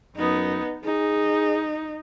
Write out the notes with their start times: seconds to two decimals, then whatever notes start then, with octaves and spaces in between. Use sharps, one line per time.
0.16 F#2 B3 D#4
0.85 D#4 G#4